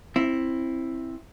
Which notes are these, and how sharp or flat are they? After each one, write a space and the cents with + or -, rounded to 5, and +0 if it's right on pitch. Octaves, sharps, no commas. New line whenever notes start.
C4 +15 E4 +0